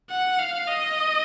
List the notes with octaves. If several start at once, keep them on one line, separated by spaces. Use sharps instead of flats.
F#5
F5
D#5